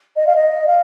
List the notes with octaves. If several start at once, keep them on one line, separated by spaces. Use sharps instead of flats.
D#5
F5
D#5
F5